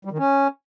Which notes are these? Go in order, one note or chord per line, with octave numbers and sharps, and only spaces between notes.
G3
D#3
C#4